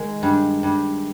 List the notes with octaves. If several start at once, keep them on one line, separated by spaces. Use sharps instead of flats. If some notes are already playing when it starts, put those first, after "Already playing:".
Already playing: D#3 G#3
G2
G2